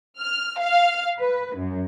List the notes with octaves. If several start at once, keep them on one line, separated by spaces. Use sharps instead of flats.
F6
F5
B4
F#2